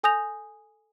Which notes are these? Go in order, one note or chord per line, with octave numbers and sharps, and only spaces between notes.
A4 G#5 D#6 G6 A#6 F7